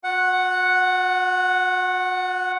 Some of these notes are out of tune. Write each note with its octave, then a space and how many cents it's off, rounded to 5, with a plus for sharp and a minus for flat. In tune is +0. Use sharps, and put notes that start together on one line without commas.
F#4 -45 F#5 +0